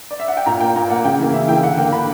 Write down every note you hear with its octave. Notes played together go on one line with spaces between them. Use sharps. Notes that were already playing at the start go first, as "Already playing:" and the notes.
D5
E5
F#5
G5
A#2 A#5
A#3 G5
A#2 A#5
A#3 F#5
C#3 G5
E3 A#3
C#3 E5
E3 A#3 G5
D3 F#5
A#3 G5
D3 B5